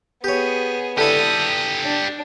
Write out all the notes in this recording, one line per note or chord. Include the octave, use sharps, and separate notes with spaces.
B3 G4 G#4 C#5
D3 E4 G4 A4 D5 D#6
D4